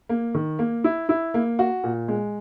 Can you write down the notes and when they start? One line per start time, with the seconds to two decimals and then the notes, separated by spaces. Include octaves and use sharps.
0.09 A#3
0.35 D#3
0.59 A#3
0.84 E4
1.09 E4
1.34 A#3
1.59 F#4
1.84 A#2
2.08 G#3